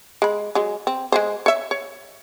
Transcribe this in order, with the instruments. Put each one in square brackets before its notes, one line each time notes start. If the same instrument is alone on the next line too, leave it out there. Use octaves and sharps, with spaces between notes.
[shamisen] G#3 B5
F#3 G#3
C4
G#3 G#4 C5
C#5 E5
C#5